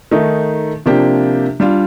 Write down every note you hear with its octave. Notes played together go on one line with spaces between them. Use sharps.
D#3 A3 D#4
C3 F3 A#3 D4 G4
G3 D4 F4